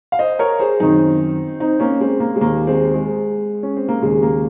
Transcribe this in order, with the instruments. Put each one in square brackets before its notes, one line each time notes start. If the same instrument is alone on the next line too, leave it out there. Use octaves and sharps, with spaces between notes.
[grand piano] F5
C5 D#5
A#4 C#5
G#4 C5
F#2 D#3 C4 D#4
C4 D#4
A#3 C#4
G#3 C4
A#3
G#3
D#2 D#3 A#3
G#3 C4
G#3
C#4
C4
A#3
D#2 C#3 G#3
A#3